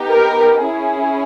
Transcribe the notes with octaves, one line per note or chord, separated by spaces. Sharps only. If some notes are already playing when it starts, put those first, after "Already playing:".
Already playing: B3 D#4 G4
A#4
C#4 E4 G#4